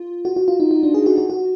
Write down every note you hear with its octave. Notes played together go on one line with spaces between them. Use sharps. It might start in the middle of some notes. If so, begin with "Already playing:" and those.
Already playing: F4
F#4
F#4
F4
D#4
D#4
D4
G#4
F#4
F#4
F#4